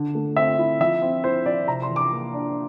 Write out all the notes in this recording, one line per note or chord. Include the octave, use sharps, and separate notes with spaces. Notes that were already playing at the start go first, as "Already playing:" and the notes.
Already playing: D3
A3
C4 E5
E4
F3 E5
C4
E4 C5
F3 D5
C3 A#5
C6
E3
D6
A#3
D4